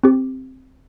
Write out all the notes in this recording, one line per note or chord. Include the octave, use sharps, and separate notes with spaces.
C4 G4